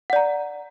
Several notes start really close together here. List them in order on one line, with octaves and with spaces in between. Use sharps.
F#5 D5 A#5